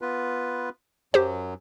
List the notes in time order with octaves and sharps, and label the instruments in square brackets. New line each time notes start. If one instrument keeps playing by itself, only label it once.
[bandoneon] B3 F4 B4
[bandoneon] F#2 F#3 [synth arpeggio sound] G4 C5